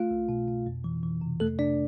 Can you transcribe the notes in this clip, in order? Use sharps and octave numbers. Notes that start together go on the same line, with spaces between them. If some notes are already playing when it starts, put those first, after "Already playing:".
Already playing: A3 F4 F5
C2
B2
B2
F2
E3
E3
C3
F2 A3 A4
C3 D4 D5